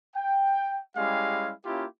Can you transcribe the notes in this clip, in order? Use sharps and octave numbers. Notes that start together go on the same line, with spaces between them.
G5
G3 G#3 C#4 E4 G4 F5
A#3 C#4 E4 F4 G4